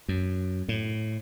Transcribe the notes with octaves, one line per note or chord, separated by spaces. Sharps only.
F#2
A2